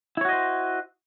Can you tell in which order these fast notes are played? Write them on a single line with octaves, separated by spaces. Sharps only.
E4 C#5 F#4 D#5 C5